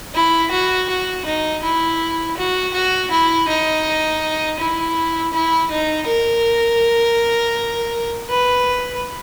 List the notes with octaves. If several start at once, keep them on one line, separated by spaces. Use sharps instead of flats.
E4
F#4
F#4
D#4
E4
F#4
F#4
E4
D#4
E4
E4
D#4
A#4
B4